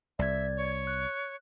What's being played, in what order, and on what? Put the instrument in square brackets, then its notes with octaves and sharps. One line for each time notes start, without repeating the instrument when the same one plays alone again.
[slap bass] C2 [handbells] D5 G#6 [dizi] E5
[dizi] C#5
[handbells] F#6